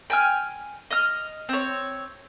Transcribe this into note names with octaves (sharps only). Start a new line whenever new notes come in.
G5 G#5 F6
D#5 F6
C4 C#5